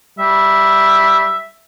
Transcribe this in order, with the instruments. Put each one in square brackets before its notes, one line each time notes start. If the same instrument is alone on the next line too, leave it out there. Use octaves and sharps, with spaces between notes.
[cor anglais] G3 [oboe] E5